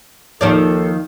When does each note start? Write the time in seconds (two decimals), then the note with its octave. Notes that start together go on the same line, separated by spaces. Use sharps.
0.41 D#2 D#3 F3 A4 D5